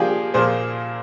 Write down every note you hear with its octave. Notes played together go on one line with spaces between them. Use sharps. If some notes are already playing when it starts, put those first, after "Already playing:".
Already playing: F3 A#3 D4 F4 G4 G#4
A#2 F3 A#3 G#4 C5